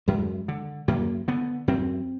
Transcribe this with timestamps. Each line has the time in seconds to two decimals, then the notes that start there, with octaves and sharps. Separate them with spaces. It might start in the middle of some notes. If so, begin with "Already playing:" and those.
0.08 F#2 G#3
0.48 D3
0.88 F#2 A#3
1.28 D3 B3
1.68 F#2 C4